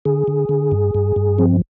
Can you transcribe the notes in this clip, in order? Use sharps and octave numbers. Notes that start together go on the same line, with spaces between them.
D3 G#4
D3
D3
G2
G2
G2
F3 C4